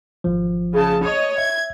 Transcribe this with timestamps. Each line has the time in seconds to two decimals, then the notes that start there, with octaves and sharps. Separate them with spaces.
0.24 G#1 F3
0.73 C#3 A5
1.04 C#5 D#5
1.38 E5 G#6